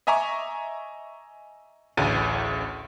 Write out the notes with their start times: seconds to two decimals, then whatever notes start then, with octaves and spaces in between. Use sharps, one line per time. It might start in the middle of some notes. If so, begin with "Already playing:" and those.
0.07 D#5 E5 G#5 A#5 C#6 D6
1.97 A1 D2 C#3 A6 D#7